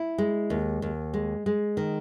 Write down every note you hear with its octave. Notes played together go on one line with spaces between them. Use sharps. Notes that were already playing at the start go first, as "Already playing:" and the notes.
Already playing: E4
G#3
D#2
D#2
G#3
G#3
D#3